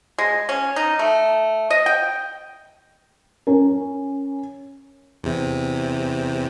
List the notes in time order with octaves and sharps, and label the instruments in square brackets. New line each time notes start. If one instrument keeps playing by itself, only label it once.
[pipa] G#3
C#4
D#4
A3
D#5
G5
[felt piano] C#4 A#4
[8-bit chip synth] E2 C3